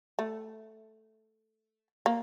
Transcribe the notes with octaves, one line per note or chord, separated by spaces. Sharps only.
A3
A#3